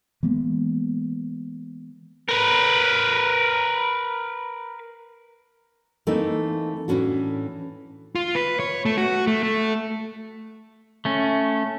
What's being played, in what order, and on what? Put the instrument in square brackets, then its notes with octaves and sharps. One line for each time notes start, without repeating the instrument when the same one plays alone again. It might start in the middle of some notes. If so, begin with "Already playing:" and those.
[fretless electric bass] E3 G#3 A#3 B3
[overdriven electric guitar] A#4 B4
[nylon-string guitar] E3 A3 A#3 C4 D#4
A2 E3 C#4 D4 F#4
[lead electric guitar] F4
B4
C#5
A3
F#4
A3
A3
[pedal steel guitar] A3 C#4